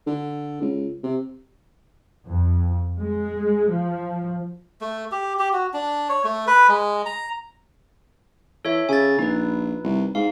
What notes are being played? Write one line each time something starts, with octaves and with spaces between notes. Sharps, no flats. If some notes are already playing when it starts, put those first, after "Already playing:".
D3
C#2
C3
F2
G#3
F3
A3
G4
G4
F#4
D4
C#5
A3
B4
G#3
A#5
E3 A4 C#5 E5
C#3 G#5 A6
A#1 D#4 B4
C2
G#2 F5